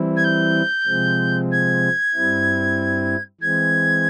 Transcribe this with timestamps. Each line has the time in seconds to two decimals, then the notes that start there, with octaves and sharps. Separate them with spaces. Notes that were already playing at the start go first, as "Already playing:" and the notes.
Already playing: E3 G3 C4 E4
0.16 G#6
0.24 G6
0.87 C3 F3 G#3 C4
1.51 G#6
2.15 G2 G3 C4 E4
3.41 E3 G#3 C4 G#6